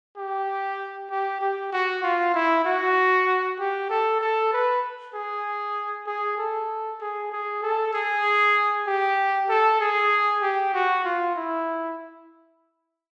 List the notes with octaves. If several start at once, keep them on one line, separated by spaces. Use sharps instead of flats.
G4
G4
G4
F#4
F4
E4
F#4
G4
A4
A4
B4
G#4
G#4
A4
G#4
G#4
A4
G#4
G4
A4
G#4
G4
F#4
F4
E4